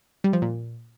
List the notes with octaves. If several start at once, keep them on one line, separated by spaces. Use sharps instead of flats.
G3
F3
A#2